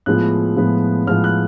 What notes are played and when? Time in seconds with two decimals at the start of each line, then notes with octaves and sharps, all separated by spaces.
0.06 A2 F3 G#3 B3 F4 F#6
0.56 A2 F3 G#3 B3 F4
1.07 A2 F3 G#3 B3 F4 F6
1.24 F#6